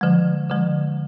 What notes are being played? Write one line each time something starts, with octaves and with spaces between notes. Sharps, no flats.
D3 F3 G#3
D3 F3 G#3